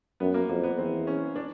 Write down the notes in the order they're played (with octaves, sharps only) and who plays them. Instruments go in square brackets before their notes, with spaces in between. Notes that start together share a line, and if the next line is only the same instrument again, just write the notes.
[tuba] F#2 [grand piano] B3
[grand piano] A#3
[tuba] F2 [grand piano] A#3
[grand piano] B3
[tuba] E2 [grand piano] C4
[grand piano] C#4
D4